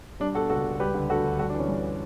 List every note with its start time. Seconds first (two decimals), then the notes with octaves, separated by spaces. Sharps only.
0.20 G3 D4
0.35 B2 F#4 A4
0.50 C#2 F#4 A4
0.65 C#2
0.80 G3 G4 B4
0.95 D3
1.10 D2 F#4 A4
1.25 D2
1.39 G3 F#4 A4
1.50 D4
1.54 E3
1.59 C#4
1.69 G2